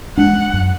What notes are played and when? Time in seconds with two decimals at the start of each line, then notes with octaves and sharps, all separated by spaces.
0.17 G#3 D4 F#5
0.53 F#2